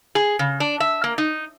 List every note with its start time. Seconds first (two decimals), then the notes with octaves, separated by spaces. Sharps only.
0.15 G#4
0.39 C#3
0.60 D4
0.80 E5
1.04 A#3
1.18 D#4